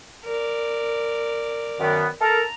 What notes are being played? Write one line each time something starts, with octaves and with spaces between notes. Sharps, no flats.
A#4 D5
F#2 D#3 B3
A4 A#4 A5 A#5